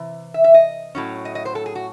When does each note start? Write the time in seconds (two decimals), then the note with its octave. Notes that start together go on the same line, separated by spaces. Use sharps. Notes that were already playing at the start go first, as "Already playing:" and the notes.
Already playing: C3 E3
0.34 E5
0.44 E5
0.54 D#5
0.95 A2 F#3 C#4
1.25 D#5
1.35 D#5
1.45 C5
1.55 A4
1.66 G#4
1.75 F#4